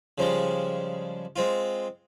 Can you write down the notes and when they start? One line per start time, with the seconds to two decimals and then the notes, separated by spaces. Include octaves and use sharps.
0.18 C#3 F3 G3 G#3
1.36 G#3 C4 F4